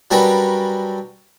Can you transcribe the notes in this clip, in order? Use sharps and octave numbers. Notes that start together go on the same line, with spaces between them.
F#3 G3 C#4 D4 A#4 B4